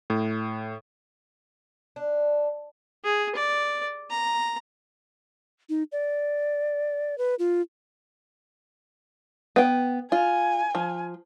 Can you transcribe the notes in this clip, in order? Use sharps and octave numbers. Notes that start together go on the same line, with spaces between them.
A2
D4
G#4
D5
A#5
D#4
D5
B4
F4
B3 G5
F4 G#5
F3